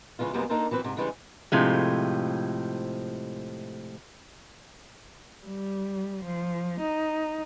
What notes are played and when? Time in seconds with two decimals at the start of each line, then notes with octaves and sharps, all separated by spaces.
0.19 C#3 E3 G#3 F4
0.33 F#2 C3 G3 G#3 A#3 B3
0.49 A#3 D4 D#4 A4 A#4 C5
0.71 E3 F#3 C4 B4
0.84 G#2 C3
0.97 C#3 E3 G3 G#3 C4 C#4
1.52 A2 C3 F3 G#3
5.47 G3
6.24 F3
6.81 D#4